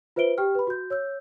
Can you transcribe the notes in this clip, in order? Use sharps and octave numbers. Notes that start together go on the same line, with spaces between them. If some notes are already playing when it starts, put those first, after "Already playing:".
F4 B4 C5 E5 D7 G7
G4 G5 F6
B4 B5
F#4 G6
C#5 E6 G6